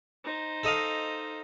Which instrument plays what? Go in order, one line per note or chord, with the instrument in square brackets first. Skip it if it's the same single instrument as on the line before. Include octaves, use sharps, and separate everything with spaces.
[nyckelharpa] D#4 C5
[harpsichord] A4 D#5 F5